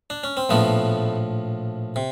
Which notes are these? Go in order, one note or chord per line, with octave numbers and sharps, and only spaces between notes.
D4
C#4
C4
A#1 A2 F3 A3 B3
C3